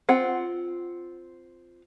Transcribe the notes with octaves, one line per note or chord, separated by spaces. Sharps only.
C4 F4 F#5